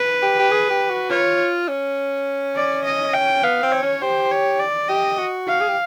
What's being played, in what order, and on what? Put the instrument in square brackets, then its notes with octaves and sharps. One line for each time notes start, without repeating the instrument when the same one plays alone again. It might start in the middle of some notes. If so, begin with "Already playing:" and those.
Already playing: [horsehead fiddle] B4
[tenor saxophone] G4
G4
G#4
G4
F#4
[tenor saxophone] F4 [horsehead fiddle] C#5
[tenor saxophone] C#4
[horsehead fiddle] D5
D#5
G5
[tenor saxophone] B3 [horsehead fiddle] F5
[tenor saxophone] C4
[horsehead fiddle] C#5
[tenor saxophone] C#4
[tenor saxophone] G4 [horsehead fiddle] C5
[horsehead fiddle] C#5
D5
[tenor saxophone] G4 [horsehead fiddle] D#5
[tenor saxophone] F#4
[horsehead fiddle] F5
[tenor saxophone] G#4
G4